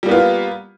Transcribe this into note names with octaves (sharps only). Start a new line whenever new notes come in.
G3 A#3 B3 F4